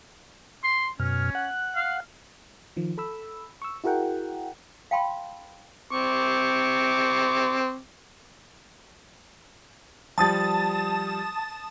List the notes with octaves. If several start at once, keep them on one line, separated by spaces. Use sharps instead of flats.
C6
F#2 B2 C#4 F6
F#5 F#6
F5
D#3 F3
A4 B5 E6
C#6 E6
E4 F#4 G#4 A#4 F#5 G5
F5 G5 A5 B5 C6
C4 C#6 D6
F3 G3 A5 D#6 A6